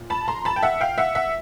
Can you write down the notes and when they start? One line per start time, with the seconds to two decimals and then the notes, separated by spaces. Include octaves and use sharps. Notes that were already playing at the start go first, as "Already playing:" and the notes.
Already playing: A#2
0.10 A5 B5
0.28 A#5 C6
0.45 A5 B5
0.56 G5
0.63 E5 F#5
0.81 F5 G5
0.98 E5 F#5
1.15 E5 F#5